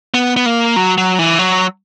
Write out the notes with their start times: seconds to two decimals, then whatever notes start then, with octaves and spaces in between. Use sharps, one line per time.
0.14 B3
0.37 B3
0.46 A#3
0.76 F#3
0.98 F#3
1.19 E3
1.39 F#3